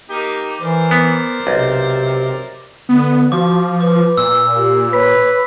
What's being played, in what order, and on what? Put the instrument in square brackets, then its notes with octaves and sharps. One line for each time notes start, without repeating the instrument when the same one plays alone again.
[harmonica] A#3 D#4 G4
[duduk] E3 [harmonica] A#4 C5 D5
[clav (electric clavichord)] B3
[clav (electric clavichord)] B1 [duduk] C3
[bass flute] D3 [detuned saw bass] B3
[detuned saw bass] F3 [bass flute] F#4 [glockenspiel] D6
[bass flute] B4 [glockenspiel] D6
[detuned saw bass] A#2 [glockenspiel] E6
[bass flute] G4
[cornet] B4 [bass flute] C#5 [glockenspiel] B6